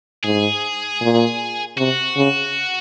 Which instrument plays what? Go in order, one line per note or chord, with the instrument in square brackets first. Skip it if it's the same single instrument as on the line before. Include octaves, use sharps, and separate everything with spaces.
[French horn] G#2 [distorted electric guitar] G#4
[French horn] A#2
[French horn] C3 [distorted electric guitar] F#4
[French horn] C#3